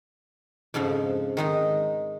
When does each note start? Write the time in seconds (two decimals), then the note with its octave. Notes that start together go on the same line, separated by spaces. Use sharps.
0.74 F2 G#2 C#3 F3
1.37 D#3 G#3 D#4